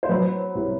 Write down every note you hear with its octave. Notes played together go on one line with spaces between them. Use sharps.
C5
F#3 B4
C2